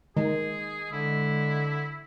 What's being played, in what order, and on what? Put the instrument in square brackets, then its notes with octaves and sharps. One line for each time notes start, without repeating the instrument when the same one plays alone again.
[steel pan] D#3 [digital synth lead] G#3 [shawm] G#4
[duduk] D3 [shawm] E4